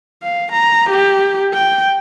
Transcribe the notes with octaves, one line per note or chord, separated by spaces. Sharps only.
F5
A#5
G4
G5